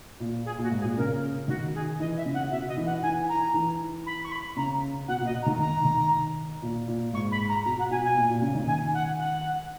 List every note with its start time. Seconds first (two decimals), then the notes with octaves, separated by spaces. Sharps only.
0.20 A#2
0.45 G#4
0.58 A#2 F#4
0.71 G#2
0.79 G#4
0.84 A#2
0.97 C#3 A#4
1.48 D#3 F#4
1.74 G#4
1.99 E3 D#5
2.17 E5
2.26 C#3
2.34 F#5
2.51 B2 E5
2.68 D#5
2.77 E3
2.86 F#5
3.02 E3 G#5
3.29 A#5
3.54 E3
4.06 B5
4.24 C#6
4.31 B5
4.56 C#3 A#5
5.08 B2 F#5
5.21 A#2
5.25 D#5
5.42 A#5
5.46 D#3
5.59 D#3 A#5
5.85 D#3
6.62 A#2
6.88 A#2
7.13 G#2 C#6
7.31 B5
7.48 A#5
7.64 B2 A#5
7.78 F#5
7.90 B2 G#5
8.04 G#5
8.17 A#2
8.29 A#2
8.42 C#3
8.55 D#3
8.67 G#5
8.94 F#5
9.18 F#5